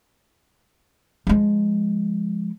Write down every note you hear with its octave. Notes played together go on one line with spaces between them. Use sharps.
F3 G#3